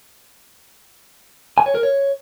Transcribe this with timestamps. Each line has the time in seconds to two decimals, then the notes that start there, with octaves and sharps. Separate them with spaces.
1.58 G#5
1.66 C#5
1.75 A#4
1.83 C#5